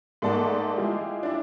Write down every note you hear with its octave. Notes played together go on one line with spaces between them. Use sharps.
G#2 A3 A#3 D5 F#5 A5
G#3 E4 F4 G4
D4 E4